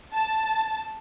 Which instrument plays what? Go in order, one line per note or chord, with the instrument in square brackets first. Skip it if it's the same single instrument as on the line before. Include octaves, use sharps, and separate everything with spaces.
[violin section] A5